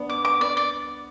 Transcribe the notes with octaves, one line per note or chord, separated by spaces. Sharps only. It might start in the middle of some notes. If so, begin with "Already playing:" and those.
Already playing: B3 D4
D6
D6
D5
D5